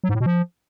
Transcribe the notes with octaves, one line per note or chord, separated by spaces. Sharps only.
F#3
G#2
A2
B2
F3